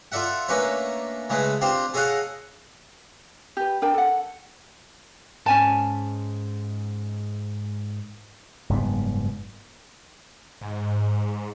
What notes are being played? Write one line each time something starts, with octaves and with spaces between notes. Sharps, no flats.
F4 A4 D5 E5 F#5
A3 A#3 C#4 D4 B4 C#5
C#3 G#3 A3 G#4 B4
C4 D4 F4 G4 C5
G#4 A4 C#5 D#5 F5 F#5
G4 B4
D4 A#4 G5 A5
A4 F#5
G#2 C#4 G#5 A5
F#1 G#2 G3 B3
G#2